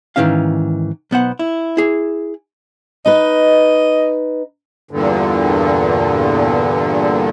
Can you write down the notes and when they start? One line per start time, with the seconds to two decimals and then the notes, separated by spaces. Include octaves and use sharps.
0.16 G#2 B2 D#3 E3 C#4 F5
1.11 B1 B3 C5 F#5
1.39 E4
1.77 E4 G#4
3.06 D#4 B4 D#5
4.91 E2 G2 A#2 D3